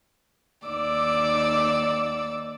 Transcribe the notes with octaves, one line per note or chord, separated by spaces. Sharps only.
D#2 D#4 D5 D6 E6